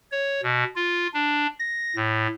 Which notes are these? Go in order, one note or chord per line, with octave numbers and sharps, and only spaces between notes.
C#5
B2
F4
D4
A#6
A2